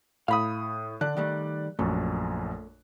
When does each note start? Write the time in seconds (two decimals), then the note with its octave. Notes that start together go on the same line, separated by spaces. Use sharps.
0.28 A2 F5 B5 D#6
1.01 D3 D5 F#6
1.17 D#3 G3 A3
1.79 A#1 F#2 A3